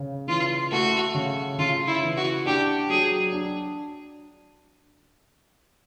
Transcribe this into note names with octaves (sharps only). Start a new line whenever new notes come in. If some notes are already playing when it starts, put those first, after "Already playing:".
Already playing: C#3
E3 F4
A3 F#4
C#3
C#3 F4
E4
E3
F#4
D4 G4
F#3 G#4
D4